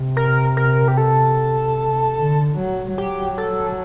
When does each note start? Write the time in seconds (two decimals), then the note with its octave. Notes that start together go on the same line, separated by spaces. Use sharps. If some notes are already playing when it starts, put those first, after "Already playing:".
Already playing: C3
0.17 A#4
0.57 A#4
0.88 G4
0.97 A4
2.18 D3
2.58 F#3
2.98 F#3 G4
3.38 A4